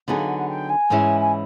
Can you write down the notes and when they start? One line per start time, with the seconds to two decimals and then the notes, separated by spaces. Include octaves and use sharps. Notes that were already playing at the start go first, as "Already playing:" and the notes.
0.08 D3 F#3 B3 D#4 G#4 F#5
0.18 F5
0.28 F#5
0.38 F#5
0.49 G5
0.70 G#5
0.90 G#2 E3 G#3 C#4 E4
1.21 G#5